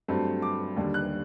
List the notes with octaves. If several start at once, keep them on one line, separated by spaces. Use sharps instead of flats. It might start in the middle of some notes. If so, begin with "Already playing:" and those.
G2 F#3 A3 C4
D6
D#2 D3 G3
F#6